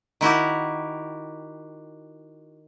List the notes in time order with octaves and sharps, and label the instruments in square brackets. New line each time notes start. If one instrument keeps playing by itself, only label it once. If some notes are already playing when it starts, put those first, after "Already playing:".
[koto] D#3 E4 F#4 G4